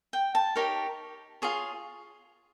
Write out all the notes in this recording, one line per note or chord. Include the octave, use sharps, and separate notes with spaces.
G5
A5
D#4 G4 A#4 C#5
F4 G#4 C#5